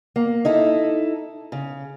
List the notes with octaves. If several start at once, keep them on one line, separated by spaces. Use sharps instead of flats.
A#3
D#4 E4 A4
C#3